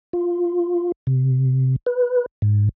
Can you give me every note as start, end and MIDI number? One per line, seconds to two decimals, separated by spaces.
0.13 0.92 65
1.07 1.76 48
1.86 2.26 71
2.42 2.69 44